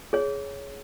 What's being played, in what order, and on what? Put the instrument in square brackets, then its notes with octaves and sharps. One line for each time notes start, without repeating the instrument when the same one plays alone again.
[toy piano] G#4 C#5